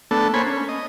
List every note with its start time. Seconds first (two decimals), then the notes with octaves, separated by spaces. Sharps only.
0.11 A3 B3 D4 A4
0.34 A#3 C5 C#5 G#5 B5
0.47 C#4
0.69 D#5